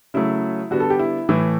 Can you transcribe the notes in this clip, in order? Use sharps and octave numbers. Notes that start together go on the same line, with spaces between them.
C#3 F#3 A3 E4
D3 G3 B3 F#4
A4
G4
E4
A2 E3 A3